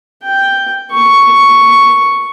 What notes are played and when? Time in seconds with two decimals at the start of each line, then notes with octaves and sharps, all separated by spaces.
0.23 G5
0.92 C#6